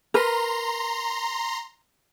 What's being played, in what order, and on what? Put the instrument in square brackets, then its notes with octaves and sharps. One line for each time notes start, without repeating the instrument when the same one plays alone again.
[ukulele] A#4 B4 [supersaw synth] A#5 C6